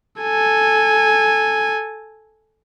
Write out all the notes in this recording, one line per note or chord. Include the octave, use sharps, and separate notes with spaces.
A4 G#5